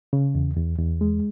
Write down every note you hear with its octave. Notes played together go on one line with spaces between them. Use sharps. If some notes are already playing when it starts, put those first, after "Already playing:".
C#3
E2
E2
E2
G#3